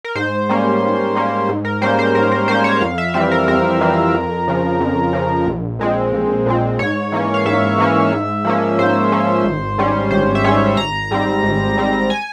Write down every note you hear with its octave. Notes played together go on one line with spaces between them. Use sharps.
A#4
G#2 C5
G3 A#3 C#4
G#2
G3 A#3 C#4
G#2
A#4
G3 A#3 C#4 C5
C5
G#2 A#4
A#4
G3 A#3 C#4 C5
C#5
F2 F5
E5
E3 G3 C4 E5
A#4
F2 A#4
E3 G3 C4
F2
C#3 F3
F2
C#3 F3
A#1
A#2 G#3 C4
A#1
A#2 G#3 C4
G#2 C#5
E3 A#3 C#4
F5
G#2 E5
E3 A#3 C#4
G#2
F3 A#3 C#4
G#2 C5
F3 A#3 C#4
G#1
G#2 G3 C#4
G#1 C5
E5
G#2 G3 C#4 C#5
G#1 A#5
G#2 G3 C4
G#1
G#2 G3 C4
G#5